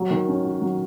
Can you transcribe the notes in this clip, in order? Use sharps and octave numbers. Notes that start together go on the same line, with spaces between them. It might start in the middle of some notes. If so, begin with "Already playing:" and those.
Already playing: F#3
D#3
C#4
F#4
F#3